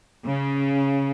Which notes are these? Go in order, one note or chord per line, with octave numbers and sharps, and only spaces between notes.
C#3